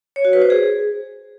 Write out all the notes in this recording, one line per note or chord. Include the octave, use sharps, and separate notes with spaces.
C#5
F#4
B4
C5
G#4